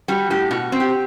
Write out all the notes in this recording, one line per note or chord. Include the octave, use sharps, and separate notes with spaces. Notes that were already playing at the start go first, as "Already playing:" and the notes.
G3 F#4
A2 G4
B2 F#4
C4
G4